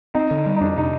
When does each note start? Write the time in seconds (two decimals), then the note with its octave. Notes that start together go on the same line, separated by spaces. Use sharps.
0.15 C4 D#4
0.31 D3
0.46 G3
0.56 D#4
0.61 F2 D4
0.77 C3 D#4